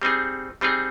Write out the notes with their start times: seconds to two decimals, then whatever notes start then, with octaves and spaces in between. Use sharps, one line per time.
0.02 G3 C4 D#4 G#4
0.61 G3 C4 D#4 G#4